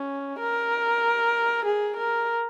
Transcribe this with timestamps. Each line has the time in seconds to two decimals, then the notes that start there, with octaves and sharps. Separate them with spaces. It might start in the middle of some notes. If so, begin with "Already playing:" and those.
Already playing: C#4
0.39 A#4
1.65 G#4
1.97 A#4